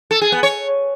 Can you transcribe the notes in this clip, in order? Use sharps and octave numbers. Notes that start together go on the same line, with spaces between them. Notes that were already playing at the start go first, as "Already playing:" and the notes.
A4
G#4
B3
C#5